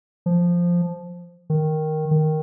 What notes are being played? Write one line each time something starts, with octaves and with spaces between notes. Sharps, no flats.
F3
D#3
D#3